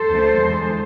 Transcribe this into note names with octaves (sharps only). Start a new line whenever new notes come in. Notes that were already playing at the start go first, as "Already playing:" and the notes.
Already playing: A4 C5
D2 D3 A3
E2 D3 G#3